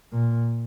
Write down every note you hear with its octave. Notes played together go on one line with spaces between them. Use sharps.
A#2